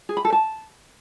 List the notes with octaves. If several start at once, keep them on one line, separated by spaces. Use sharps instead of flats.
G#4
B5
A4
A5